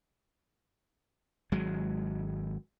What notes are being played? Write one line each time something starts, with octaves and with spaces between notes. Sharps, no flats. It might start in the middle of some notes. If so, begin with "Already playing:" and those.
G#1 F#3 G#3